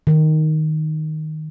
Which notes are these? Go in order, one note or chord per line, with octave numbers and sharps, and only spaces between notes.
D#3